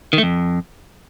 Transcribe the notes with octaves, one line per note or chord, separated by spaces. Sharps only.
D#3
A3
F2